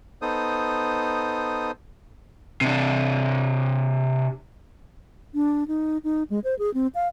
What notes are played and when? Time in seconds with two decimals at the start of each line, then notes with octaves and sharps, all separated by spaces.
0.22 B3 D#4 A4 C5 D#6
2.61 C3 D4
5.34 D4
5.68 D#4
6.04 D#4
6.30 G#3
6.44 C5
6.59 G#4
6.74 C4
6.95 F5